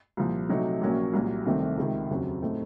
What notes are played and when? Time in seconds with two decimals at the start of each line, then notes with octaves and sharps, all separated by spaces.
0.17 C2 A#2 F3
0.49 C3 F#3 A3 D#4
0.81 A#1 A#2 F#3 A#3 C#4
1.13 C2 A#2 F#3
1.46 C2 C3 D#3 A3 C4
1.78 C#2 C3 D#3
2.10 F1 D#2 C#3 F#3 C4
2.42 A2 A3 C4 D#4